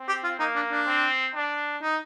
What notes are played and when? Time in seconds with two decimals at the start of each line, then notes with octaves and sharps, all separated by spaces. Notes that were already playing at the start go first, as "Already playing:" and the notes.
Already playing: C4
0.08 G4
0.24 F4
0.39 A#3 D#4
0.56 D4
0.71 D4
0.87 C4
1.35 D4
1.82 D#4